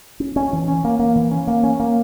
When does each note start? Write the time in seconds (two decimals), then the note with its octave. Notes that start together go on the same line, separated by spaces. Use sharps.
0.20 C#4
0.36 C#4
0.53 E3
0.68 C#4
0.84 A#3
0.99 A#3
1.15 E3
1.31 C#4
1.47 A#3
1.63 C#4
1.80 A#3